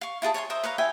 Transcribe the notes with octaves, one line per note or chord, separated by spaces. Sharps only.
F5 C#6
E4 F4 G#4 A5
C#5 G#5 A5 C6
A#4 C5 D#5 E5
B4 C#5 F5 A#5
E4 E5 G5 G#5